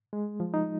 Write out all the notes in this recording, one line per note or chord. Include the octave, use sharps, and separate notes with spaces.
G#3
F3
D#4